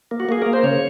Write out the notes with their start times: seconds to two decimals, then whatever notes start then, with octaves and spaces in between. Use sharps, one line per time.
0.11 A#3
0.20 F#4
0.29 A#3 G#4
0.42 A#3 A#4
0.53 C5
0.63 C#3 C#5